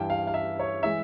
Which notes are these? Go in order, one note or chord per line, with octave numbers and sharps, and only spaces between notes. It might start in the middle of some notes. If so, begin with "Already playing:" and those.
Already playing: G2 E3 G3 G5
F5
F5
E5
C#5
E3 G#3 E5